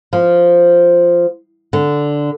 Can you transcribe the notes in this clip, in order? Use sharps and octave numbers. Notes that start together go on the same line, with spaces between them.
F3
D3